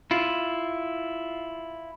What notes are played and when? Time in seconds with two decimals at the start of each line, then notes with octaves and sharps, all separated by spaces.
0.11 E4 F4